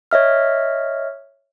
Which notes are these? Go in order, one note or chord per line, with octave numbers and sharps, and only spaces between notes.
C#5 D#5 E5 F6